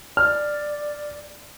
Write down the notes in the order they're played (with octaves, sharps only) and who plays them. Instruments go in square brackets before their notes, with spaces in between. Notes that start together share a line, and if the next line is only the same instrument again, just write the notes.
[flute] D5 [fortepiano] F6